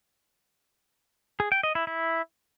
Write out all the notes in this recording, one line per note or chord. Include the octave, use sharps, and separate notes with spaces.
G#4
G5
D#5
E4
E4